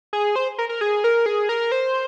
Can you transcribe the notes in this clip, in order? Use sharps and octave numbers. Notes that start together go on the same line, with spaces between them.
G#4
C5
A#4
A#4
G#4
A#4
G#4
A#4
C5